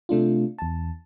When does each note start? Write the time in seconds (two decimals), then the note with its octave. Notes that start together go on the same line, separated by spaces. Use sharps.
0.09 C3 A3 D4 F4
0.58 E2 A5